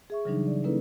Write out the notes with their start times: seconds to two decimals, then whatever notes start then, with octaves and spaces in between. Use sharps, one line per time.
0.10 G#4 E5 C#6
0.25 C#3 E3 F#3 G3 D4 D#4
0.47 D5
0.64 A#3 C#4 D#4 E4 A4 B4